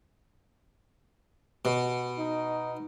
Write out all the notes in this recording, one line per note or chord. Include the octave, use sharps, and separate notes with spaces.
B2
D#4